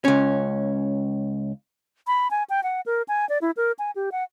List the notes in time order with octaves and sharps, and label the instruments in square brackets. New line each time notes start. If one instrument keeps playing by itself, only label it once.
[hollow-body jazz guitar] C#2 C#4
[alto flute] B5
G#5
G5
F#5
A#4
G#5
D5
E4
A#4
G#5
G4
F#5